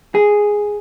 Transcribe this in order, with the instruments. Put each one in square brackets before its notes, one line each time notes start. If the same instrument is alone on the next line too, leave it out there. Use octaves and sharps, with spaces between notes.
[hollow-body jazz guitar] G#4